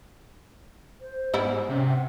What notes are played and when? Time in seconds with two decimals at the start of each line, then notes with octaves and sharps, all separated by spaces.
1.01 C5
1.34 G#2 G3 B3 E4
1.69 C3 C#4
1.86 F#5